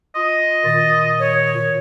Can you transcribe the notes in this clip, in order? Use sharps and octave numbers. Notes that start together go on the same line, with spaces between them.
F4 D#5
A#2 D#3 A6
C#5